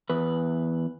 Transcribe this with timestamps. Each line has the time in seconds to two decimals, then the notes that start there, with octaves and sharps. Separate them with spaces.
0.10 E2 B4